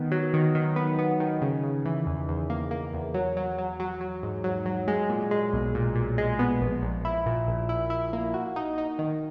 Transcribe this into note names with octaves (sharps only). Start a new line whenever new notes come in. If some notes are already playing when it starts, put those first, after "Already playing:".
Already playing: D#3 B3
F#3
D#3
D#3
B3
B3
D#3
C#3
C#3
E3
E2
E2
A#3
A#3
E2
F#3
F#3
F#3
F#3
F#3
G#2
F#3
F#3
G#3
A#2
G#3
B1
A#2
A#2
G#3
B3
A#1
A#1
E4
A#2
A#1
E4
E4
A#3
F#4
D#4
D#4
D#3